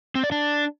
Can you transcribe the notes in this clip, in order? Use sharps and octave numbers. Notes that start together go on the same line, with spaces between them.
C4
D5
D4